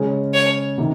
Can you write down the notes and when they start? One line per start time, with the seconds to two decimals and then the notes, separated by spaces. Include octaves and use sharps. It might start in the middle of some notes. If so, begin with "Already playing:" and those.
Already playing: C#3 G#3 C#4
0.34 C#5
0.78 C3 D#3